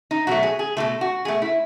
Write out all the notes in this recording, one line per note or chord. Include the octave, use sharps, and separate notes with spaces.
D#4
B2 F#3 A3 F#4
G#4
G#4
B2 F#3 A3 A4
F#4
B2 A3 G#4
E4